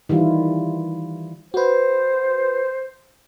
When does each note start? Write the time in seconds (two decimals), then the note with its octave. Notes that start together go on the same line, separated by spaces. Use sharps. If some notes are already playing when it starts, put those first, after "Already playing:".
0.09 D#3 E3 G3 E4 F4
1.54 F#4 B4 C5